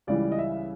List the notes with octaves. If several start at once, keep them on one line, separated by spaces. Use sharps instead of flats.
C#2 C#3 E3 G3 D5
D#5
E5